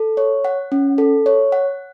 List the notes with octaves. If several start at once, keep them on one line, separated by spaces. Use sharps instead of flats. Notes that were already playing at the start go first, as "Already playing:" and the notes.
Already playing: A4
C#5
F#5
C#4
A4
C#5
F#5